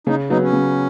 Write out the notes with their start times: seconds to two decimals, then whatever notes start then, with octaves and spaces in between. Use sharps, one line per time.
0.07 C#3 D#4
0.30 F#3 B3 D#4
0.41 C#4
0.53 C#3